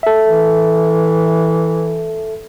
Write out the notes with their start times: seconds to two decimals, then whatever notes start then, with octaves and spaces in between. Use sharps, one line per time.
0.03 A4 E5
0.25 E3